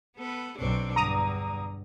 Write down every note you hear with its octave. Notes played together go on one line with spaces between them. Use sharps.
B3 A4 B4
B1 C4 D4 A4
E2 G2 D3 A#5 D#6